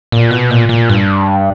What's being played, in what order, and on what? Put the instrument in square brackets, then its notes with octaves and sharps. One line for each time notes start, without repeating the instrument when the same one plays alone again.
[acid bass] A#2
B2
A#2
A#2
G2